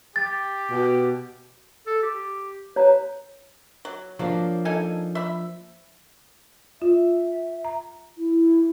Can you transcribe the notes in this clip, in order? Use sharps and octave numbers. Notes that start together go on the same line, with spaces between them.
G4 A6
B2
A4
G4
B4 C#5 A#5
F#3
F3 F#3 A#3 D4
D#4 A4 G#5
E5 B5
F4 E5
A#5
E4